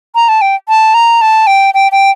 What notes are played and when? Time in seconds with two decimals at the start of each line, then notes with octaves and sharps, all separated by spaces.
0.15 A#5
0.29 A5
0.41 G5
0.69 A5
0.94 A#5
1.21 A5
1.47 G5
1.74 G5
1.92 G5